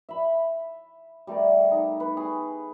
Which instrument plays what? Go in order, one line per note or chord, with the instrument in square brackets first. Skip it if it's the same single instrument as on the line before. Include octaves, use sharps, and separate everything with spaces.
[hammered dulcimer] E5 B5
G3 A3 A#4 D5
D#4
B4
G#4 C#6